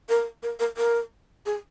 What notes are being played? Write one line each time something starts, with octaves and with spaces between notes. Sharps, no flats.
A#4
A#4
A#4
A#4
G#4